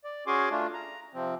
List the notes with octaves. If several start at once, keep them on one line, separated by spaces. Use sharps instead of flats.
D5
C#4 F#4 G#4 G#5 C6 D6
A3 D4 F4
A#5
C3 F3 C4